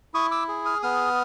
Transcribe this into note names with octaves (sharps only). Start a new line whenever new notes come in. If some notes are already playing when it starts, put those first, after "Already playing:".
E4 C#6 D#6
D6 E6
G#4
D#6 F6
B3 D#6 F6